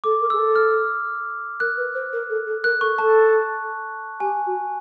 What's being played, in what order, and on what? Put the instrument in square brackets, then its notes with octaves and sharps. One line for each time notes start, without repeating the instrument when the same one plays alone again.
[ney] A4 [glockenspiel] D6
[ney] A#4
[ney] G#4 [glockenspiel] E6
[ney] A4
[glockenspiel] F6
[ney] A#4 [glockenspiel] F#6
[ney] B4
C5
A#4
A4
A4
[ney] A#4 [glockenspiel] F#6
[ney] A4 [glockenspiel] C#6
[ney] A4 [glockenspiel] A5
[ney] G4 [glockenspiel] G#5
[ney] F#4